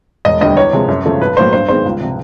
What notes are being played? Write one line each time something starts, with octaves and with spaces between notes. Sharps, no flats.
E1 D#5
D2 D3 G3 D#5
E2 C#5
C3 F3 G#3
F#2
C#3 F3 A3
B1 B4
A2 F#3 A#3 C5
G2 C5
D#3 G#3 B3 C5
C#2
C3 F3